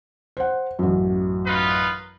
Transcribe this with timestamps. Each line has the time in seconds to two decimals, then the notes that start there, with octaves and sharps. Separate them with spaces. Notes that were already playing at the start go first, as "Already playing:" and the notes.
0.37 C5 F#5
0.79 A1 F#2
1.47 D#4 F4 B4